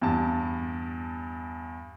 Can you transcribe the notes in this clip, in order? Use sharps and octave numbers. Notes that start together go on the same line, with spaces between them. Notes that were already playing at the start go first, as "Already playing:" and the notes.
E2 G2 A5